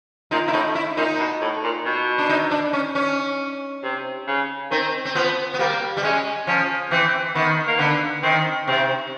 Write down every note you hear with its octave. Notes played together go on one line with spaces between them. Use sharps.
A#2 D#4
E4
A2 D#4
E4
A#2 D#4
B2
A2
A#2
B2
D4
D#4
D4
C#4
C#4
C3
C#3
D#3 C4
C4
F3 B3
B3
G3 A#3
G3
G#3 C#4
F3 C#4
E3 C4
D#3 B3
A#3
D3 B3
D#3 C4
C3 C4